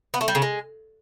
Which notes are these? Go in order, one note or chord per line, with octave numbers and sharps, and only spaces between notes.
B3
A3
G3
C#3
G#3